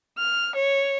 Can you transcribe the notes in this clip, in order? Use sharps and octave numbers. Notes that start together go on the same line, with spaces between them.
F6
C#5